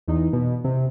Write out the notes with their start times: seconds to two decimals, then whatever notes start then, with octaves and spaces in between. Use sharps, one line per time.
0.08 E2 D#4
0.33 B2
0.64 C3